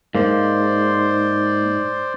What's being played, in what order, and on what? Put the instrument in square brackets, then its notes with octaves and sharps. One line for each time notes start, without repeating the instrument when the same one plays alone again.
[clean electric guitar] G#2 [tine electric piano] A#3 [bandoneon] C5 D5 C6